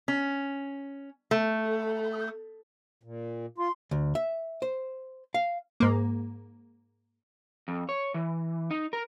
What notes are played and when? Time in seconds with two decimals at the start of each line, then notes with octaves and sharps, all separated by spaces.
0.08 C#4
1.31 A3
3.03 A#2
3.58 F4 C6
3.91 D2
4.15 E5
4.62 C5
5.34 F5
5.80 G#2 A#3
7.68 F2
7.89 C#5
8.14 E3
8.71 D#4
8.93 A#4